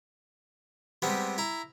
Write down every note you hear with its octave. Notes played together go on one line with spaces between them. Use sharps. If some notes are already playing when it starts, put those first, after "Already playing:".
C3 G3 G#3 B3
E4 A#5